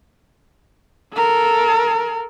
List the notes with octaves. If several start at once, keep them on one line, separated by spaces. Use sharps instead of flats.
A4 A#4